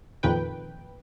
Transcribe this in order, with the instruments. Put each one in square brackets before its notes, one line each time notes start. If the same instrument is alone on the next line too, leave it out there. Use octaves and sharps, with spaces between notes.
[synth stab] F2 A#2 D#3 B4 G5